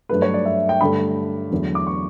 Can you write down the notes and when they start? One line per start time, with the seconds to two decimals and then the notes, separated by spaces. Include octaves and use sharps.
0.09 G2 F#3 A3 B4
0.22 C#5
0.34 D5
0.45 E5
0.69 G5
0.81 G2 D3 A3 B5
1.51 E2 D3 F#3 A3
1.75 D6
1.87 C#6